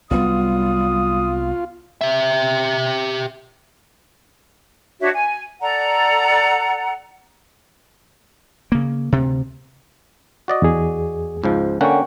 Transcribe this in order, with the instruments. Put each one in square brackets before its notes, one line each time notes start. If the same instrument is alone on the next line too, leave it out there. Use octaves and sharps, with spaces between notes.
[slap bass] C2 F#3 B3 [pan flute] G3 [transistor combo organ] F4 [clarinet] D#6
[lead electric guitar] G4 E5
[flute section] D4 F#4 C#5 E5
G#5
A4 D5 F#5 A#5
[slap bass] C#3 A#3
D2 C3
[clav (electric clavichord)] F#4 D5 D#5
[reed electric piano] E2 G#4
[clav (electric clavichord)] C#2 G#2 F3
[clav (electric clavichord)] D3 A#3 C#4 [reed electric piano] F#5 G5 C#6